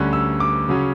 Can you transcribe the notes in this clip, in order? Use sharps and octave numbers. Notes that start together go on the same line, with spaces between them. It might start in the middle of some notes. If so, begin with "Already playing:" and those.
Already playing: D2 D3 G3 C#4 F#6
E6
D6
C#3 F#3 C#4